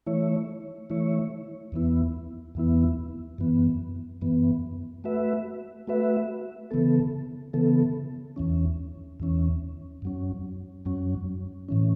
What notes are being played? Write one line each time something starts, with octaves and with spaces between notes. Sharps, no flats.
E3 A3 E4 C#5
E3 A3 E4 C#5
E2 E3 B3 E4
E2 E3 B3 E4
F#2 E3 B3
F#2 E3 B3
A3 F#4 B4 E5
A3 F#4 B4 E5
C#3 E3 B3 A4
C#3 E3 B3 A4
E2 E3 C#4
E2 E3 C#4
F#2 F#3 C#4
F#2 F#3 C#4
A2 E3 C#4